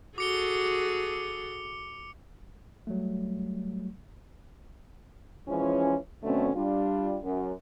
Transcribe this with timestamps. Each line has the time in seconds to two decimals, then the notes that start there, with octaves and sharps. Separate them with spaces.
0.18 F#4 G#4 A4 D6 C#7 G7
2.87 F#3 G3 A3
5.48 E3 F3 G#3 C#4
6.23 B2 D3 F#3 A3 C4 C#4
6.55 G3 D4 F4
7.23 F#2